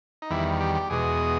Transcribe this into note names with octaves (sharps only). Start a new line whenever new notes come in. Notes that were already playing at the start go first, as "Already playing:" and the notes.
D#4
E2 D#3 G3 E4
G4
G4
E2 B2 G#3 G#4